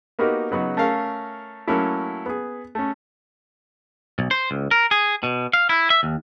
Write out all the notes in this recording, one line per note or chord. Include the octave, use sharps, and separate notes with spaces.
A#3 B3 D#4 F#4 G4 A#4
C#3 F#3 B3 D#4 F#4
A3 C#4 A#4 F5
F#3 A3 A#3 C#4 E4
B3 G#4
A3 C#4
B1
C5
C#2
A#4
G#4
B2
F5
E4
E5
D#2